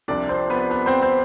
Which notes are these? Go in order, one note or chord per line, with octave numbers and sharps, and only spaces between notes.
C2 C3 F3 D4 D5
C4 C5
B3 B4
B3 B4
C4 C5
C4 C5